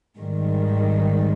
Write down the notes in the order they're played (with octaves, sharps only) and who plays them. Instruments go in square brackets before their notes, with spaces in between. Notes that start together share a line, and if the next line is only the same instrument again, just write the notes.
[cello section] G#2 D#3 G3